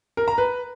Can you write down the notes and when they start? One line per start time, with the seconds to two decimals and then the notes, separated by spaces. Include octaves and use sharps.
0.17 A#4
0.28 A#5
0.38 B4